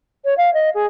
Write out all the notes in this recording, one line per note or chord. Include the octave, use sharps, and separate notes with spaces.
C#5
F5
D#5
G#4